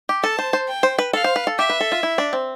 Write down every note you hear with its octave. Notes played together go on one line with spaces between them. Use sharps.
G4
A4 A5
C5
C5
G5
C5
B4
A4 F5
C5
B4
A4
G4 E5
B4
A4
F4
E4
D4
C4